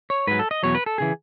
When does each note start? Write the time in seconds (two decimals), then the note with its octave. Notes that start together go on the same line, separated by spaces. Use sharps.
0.10 C#5
0.27 G#2 F#3 B4
0.39 A4
0.51 D#5
0.63 E2 B2 F#3 C#5
0.75 B4
0.86 A4
0.98 C#3 E3 G#4